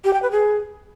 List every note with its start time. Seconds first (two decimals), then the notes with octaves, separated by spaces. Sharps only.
0.04 G4
0.13 G5
0.22 B4
0.31 G#4